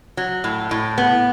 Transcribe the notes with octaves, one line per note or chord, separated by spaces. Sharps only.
F#3
A2
A2
B3